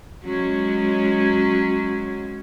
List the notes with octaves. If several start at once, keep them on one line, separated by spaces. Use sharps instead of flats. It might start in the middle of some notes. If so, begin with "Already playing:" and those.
F#3 G#3 C#4